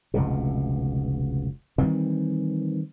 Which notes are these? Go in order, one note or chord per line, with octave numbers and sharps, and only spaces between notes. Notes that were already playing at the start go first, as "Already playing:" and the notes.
F1 C#2 B2
D#3 E3 G3 C4